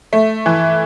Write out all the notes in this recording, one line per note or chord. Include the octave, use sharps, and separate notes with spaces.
A3
E3